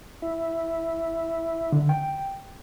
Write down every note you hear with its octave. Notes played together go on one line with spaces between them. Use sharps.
E4
D3
G5